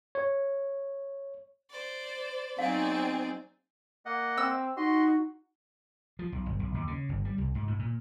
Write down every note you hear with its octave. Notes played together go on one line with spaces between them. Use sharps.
C#5
C5 D5
F#3 B3 C4 D#4 G#4 D5 F5
A#3 D#5 F#5
C4 E6
D#4 F#4 D#5 C6
F3
B1
G1
B1
D#2
C#3
G1
G3
C2
G#2
A2
A#2